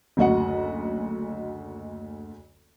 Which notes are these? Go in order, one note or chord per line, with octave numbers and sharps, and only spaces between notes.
F#1 D2 F#4 D#5 F#5